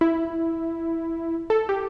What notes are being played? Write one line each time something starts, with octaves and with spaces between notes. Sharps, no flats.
E4
A4
G4